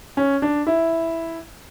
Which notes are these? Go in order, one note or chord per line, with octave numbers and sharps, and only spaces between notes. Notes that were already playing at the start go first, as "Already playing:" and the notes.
C#4
D4
E4